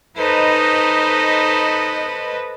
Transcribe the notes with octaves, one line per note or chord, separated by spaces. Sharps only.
D#4 A4 B4 C5 D#5